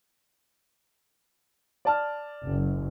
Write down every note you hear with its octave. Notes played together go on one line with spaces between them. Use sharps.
D5 A5 F6
F#1